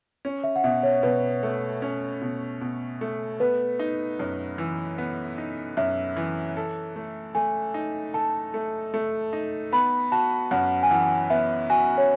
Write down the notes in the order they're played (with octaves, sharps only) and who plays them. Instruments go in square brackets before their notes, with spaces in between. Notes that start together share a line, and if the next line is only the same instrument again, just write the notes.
[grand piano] C#4
[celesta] E5
F#5
[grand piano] B2 [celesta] E5
[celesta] C#5
[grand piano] B2 [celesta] B4
[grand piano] A3
C#4
B2
B2
A3
[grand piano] B3 [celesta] B4
[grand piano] D#4
F#2
E3
B3
D#4
[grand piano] F#2 [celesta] E5
[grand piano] E3
A4
A3
[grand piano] A3 [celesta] G#5
[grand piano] D#4
[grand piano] A4 [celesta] A5
[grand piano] A3
A3
D#4
[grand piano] B3 [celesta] B5
[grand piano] F#4 [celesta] A5
[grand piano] F#2 [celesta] F#5
[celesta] G#5
[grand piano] E3 [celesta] F#5
[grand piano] B3 [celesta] E5
[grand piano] F#4 [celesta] G#5
[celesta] C#5